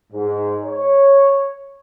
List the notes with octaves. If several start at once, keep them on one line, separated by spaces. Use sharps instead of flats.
G#2
C#5